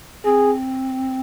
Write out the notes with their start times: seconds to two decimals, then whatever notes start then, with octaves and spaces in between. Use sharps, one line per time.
0.25 C4 G#4